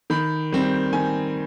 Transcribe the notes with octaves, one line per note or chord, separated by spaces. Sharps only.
D#3 B5
G3 C4
D#3 G#5